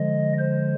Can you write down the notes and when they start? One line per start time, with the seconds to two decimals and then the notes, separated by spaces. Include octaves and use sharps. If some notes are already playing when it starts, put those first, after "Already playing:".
Already playing: D3 F3 G#3 D#5
0.38 C5